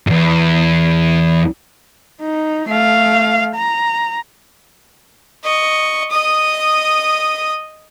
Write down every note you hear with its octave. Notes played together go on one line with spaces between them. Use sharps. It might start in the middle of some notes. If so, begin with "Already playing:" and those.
E2 G#2
D#4
A3 F5
A#5
D#5 C#6
D#5 D#6